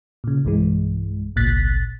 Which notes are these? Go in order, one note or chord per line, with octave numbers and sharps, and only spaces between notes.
A#2 C#3
B1 G2 E3 G#3
G#1 C#2 A#2 F#6 A6 B6